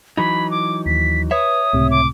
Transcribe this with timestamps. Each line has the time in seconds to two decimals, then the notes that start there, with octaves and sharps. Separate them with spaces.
0.18 E3 F#3 D#4 B5
0.51 D6
0.86 D#2 B6
1.31 B4 C#5 E5 D#6
1.73 C#2 A2 C3
1.91 D6